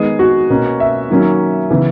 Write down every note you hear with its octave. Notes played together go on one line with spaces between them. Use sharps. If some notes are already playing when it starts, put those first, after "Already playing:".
Already playing: D#3 G#3 B3 G#4
F#4
B2 A#3 C#4
E5
D#3 F#3 A#3 C#4
C#3 E3 B3